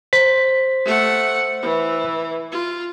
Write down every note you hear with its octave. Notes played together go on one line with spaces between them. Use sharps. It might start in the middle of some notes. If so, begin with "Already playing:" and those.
C5 B6
A3 F#5
E3
F4